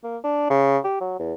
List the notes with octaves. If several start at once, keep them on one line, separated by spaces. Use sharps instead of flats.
A#3
D4
C#3
G4
F#3
E2